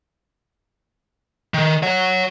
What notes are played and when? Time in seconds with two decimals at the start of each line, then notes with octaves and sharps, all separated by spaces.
1.54 D#3
1.83 C#5 F#5